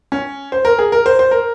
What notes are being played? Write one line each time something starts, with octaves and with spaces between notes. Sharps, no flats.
C#4
C5
A#4
G#4
A#4
C5
C5
A#4